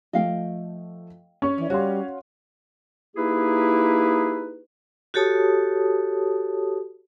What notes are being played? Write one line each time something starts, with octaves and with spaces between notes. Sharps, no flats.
F3 A3 D#5 F5 G5
C#4 C#6
E3 D5
G3 F#4 C#5 F5 C6
A#3 D#4 E4 G4 G#4 B4
F#4 G4 A4 C#5 A5 D#6